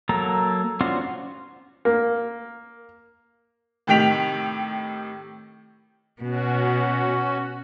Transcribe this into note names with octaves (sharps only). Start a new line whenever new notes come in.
F#3 A#3 A4 A#5
C#4 D4 F4 F#4 C5
A#3
A2 C3 D#3 G5 B6 F7
B2 C#4 F#4